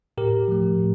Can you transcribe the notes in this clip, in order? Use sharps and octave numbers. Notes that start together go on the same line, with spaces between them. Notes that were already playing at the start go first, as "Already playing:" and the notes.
A2 G4 A#4
F3 A3
A2